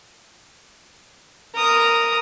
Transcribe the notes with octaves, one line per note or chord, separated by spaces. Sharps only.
A#4 D#6